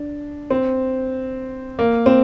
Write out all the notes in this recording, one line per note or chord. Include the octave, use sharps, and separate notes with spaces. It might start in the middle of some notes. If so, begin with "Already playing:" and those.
Already playing: D4
C4
A#3
C4